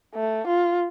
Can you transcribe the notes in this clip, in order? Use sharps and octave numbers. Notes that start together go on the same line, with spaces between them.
A3
F4